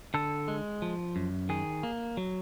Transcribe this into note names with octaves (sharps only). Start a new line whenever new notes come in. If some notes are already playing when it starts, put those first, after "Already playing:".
D3 A4
G#3
F3
F#2
D#3 G#4
A#3
F#3